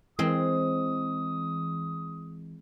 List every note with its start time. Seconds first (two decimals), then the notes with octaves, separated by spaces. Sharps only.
0.19 E3 G#3 C4 D#6